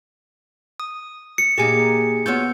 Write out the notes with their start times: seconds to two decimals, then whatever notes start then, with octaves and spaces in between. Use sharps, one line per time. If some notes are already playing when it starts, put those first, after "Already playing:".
0.80 D#6
1.38 C#7
1.58 A#2 A#3 D#4 G4 G#4 G#5
2.26 B3 F4 F#4 C#5 E6 G6